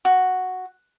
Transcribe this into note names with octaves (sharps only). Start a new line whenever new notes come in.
F#4